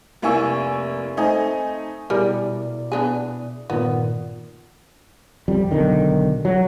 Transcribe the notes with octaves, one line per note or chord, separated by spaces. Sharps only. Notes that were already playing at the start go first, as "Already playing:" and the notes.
F1 A#3 E4 G#5 C#6 E6
A3 C4 D#4 D#5 G#5
B2 G3 E4 G#4 A#4 D5
B3 D4 G#4
G2 A#2 D#3 B3
F2 G3
B1 D3 D#3
F#3